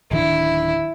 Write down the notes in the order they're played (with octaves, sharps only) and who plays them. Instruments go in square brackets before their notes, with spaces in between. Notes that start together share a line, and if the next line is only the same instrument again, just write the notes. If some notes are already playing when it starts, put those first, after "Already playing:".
[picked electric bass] D1 D#3 D4 [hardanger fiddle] E4